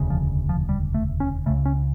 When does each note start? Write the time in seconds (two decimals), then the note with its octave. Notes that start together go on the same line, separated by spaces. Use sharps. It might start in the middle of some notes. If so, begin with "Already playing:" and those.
Already playing: E1 D2 C#3
0.10 F3
0.49 F3
0.69 G3
0.94 A3
1.20 C#4
1.46 C#3 A3
1.50 C#2
1.65 C#4